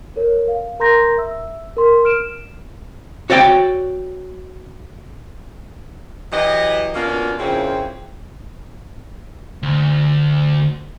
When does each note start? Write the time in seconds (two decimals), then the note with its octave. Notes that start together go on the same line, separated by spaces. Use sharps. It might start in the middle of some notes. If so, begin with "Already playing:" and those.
0.16 A4 A#4 C#5
0.48 F5
0.80 A#4 A#5 C6 G6 A#6
1.17 E5 E6
1.77 A#4 C6
2.05 F6 D7 E7
3.30 F#4 C#5 D5 E5 G5
6.32 E3 F#3 G4 D#5
6.95 B2 A#3 C#4 D4 F4
7.39 F2 A#2 C#3 C4 C#4 E4
9.63 D2